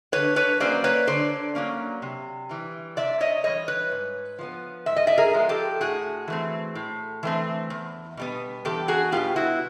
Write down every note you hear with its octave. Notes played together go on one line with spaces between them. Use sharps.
D3 B4 C#5
B4 C#5
F#3 A#3 C#4 C5 D5
B4 C#5
D3 C5 D5
F#3 A#3 C#4
C3
E3 G3
C3 D5 E5
C#5 D#5
E3 G3 C#5 D#5
B4 C#5
G#2
F3 G#3 B3
G#2 E5
D#5
D5 E5
G#4 A#4
F3 G#3 B3
G4 A4
A2 F#4 G#4
E3 A3 C4
A2
E3 A3 C4
E2
B2 G3 B3
E2 G4 A4
F#4 G#4
B2 G3 B3 F4 G4
E4 F#4